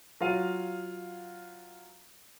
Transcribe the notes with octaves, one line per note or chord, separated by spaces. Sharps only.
F#3 F4 F5 D#7